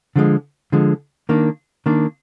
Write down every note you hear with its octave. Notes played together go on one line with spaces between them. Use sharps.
D3 F3 G#3
D3 F3 G#3
D#3 A#3 D4
D#3 A#3 D4